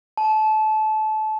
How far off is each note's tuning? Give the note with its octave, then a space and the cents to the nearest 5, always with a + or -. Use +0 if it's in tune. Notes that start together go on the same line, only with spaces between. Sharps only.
A5 -25